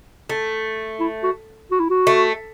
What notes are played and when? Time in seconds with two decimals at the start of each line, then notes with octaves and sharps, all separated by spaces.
0.29 A3
1.00 E4
1.23 F#4
1.71 F#4
1.80 E4
1.90 F#4
2.07 A3